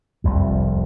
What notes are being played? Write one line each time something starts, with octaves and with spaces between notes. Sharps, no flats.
F1 C2 F2